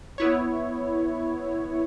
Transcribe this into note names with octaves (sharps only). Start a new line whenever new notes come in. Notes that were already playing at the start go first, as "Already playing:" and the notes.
B3 E4 C#5